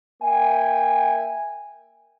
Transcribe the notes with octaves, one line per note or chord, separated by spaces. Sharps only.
A#3 E5 G5 G#5